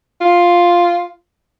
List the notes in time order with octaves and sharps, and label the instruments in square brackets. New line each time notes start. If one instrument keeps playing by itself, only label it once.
[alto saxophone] F4